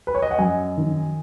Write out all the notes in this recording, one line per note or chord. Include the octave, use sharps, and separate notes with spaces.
B4
C#5
D#5
F#5
F#2 D#5 G#5
D#3